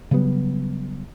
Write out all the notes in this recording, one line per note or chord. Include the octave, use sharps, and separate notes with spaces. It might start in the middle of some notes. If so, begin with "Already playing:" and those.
C#3 F#3 G3 B3